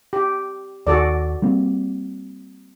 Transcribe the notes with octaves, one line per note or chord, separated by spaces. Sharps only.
G4
D#2 F#4 A4 D5
G3 A#3 C4